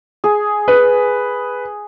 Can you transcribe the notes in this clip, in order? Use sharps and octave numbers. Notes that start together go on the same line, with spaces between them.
G#4
B4